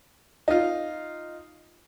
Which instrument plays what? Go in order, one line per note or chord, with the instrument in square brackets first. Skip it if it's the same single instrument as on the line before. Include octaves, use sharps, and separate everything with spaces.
[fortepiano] D#4 F4